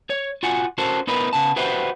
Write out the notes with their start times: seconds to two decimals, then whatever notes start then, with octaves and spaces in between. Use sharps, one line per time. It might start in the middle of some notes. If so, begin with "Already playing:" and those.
0.10 C#5
0.43 F4 F#4 F#5 G#5
0.78 C#4 F#4 A4 A#4 C5
1.07 B3 D#4 E4 A#4 B4
1.33 C#3 B3 A5
1.56 F#4 G4 B4 C5 E5 F#5